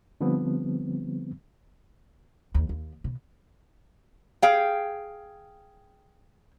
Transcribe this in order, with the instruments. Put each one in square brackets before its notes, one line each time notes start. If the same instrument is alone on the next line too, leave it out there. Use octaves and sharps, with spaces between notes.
[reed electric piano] D3 F3 G3 B3 C4
[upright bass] D#2
D#2
B2
[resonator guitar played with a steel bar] G#4 F5 G5